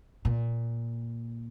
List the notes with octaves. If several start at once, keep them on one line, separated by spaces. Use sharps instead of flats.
A#2